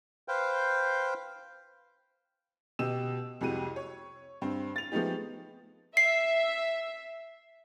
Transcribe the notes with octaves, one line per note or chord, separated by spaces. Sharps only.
B4 C5 F5 G5
B2 G4 D#5 E6 E7
C2 F2 G#3 F#4 G4 D#7
C#5
G2 C4
A6 F7
F3 G#3 A3 B3 D#4 G4
E5 C7